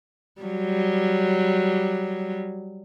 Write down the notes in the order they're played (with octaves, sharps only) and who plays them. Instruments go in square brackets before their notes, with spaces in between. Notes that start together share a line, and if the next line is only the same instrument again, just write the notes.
[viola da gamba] F#3 G3